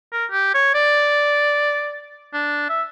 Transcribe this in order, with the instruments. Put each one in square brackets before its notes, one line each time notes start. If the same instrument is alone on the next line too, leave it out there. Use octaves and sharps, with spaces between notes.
[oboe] A#4
G4
C#5
D5
D4
E5